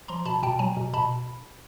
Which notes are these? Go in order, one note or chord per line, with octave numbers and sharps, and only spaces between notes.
F3 A#5 C6
B2 A5 B5
B2 G5 A5
F#3 G#5 A#5
B2
B2 A5 B5